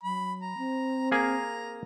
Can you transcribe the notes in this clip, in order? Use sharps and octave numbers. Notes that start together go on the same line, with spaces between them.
F#3 B5
A#5
C4
A#3 G#4 A#4 A#5